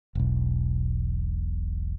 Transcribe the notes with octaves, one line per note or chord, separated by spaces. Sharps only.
E1 B1